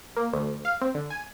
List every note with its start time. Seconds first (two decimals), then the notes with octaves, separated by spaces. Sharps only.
0.16 A#3
0.33 D2
0.65 F5
0.81 C4
0.94 D3
1.10 G#5